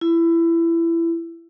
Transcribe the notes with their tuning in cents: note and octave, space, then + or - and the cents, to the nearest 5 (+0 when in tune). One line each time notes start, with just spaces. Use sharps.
E4 +20